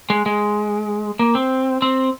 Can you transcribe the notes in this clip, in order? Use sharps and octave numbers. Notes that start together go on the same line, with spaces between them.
G#3
G#3
A#3
C4
C4